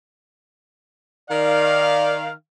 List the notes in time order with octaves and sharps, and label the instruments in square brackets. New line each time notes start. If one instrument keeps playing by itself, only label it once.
[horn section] D#3 F5 [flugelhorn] D5